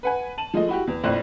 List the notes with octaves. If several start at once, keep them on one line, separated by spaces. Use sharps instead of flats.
B4 F#5 G#5
A5 D#7 F#7
F3 G#3 A3 D#5
E4 F#4 G4
E2
A#1 F2 A2 C5 D5 F#6